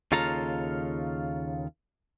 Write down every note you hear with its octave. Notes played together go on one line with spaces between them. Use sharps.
D#2 C#3 F4 A4 F5 A#5